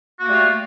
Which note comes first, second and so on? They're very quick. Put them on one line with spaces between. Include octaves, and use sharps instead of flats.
F#4 A#3 A3 G3 F4